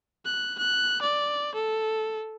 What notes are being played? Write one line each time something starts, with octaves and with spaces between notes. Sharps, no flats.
F#6
F#6
D5
A4